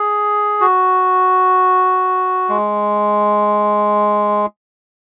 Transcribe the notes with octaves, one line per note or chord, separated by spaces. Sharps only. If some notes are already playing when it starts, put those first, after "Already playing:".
Already playing: G#4
F#4
G#3